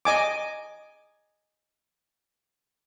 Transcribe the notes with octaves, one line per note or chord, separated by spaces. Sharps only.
D#5 G#5 D6